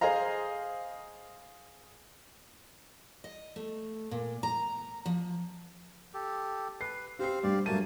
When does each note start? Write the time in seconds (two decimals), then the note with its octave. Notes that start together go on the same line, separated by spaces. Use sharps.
0.01 G#4 C5 D#5 F5 A#5
3.24 D#5
3.56 A3
4.11 A#2
4.43 A#5
5.06 F3
6.14 G4 A4
6.81 B4 C7
7.19 C4 G4 C5 F5 C7
7.43 G2 G3 G4 D5 F5
7.66 G2 F#3 A3 A#3 A5 D#7